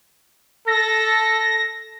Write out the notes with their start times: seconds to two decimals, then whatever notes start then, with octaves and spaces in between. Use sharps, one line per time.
0.68 A4 A#6